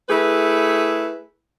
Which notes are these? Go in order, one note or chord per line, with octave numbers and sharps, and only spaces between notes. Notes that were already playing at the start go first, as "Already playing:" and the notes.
A3 E4 G#4 B4